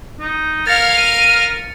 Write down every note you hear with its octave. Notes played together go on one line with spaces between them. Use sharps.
D#4
A#4 F5 F6 G#6 A6 C#7
D#7